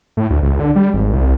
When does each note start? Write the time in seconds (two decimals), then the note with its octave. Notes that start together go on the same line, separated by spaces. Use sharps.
0.17 A2
0.30 D2
0.42 C#2
0.59 D3
0.76 G3
0.94 G#1
1.13 C2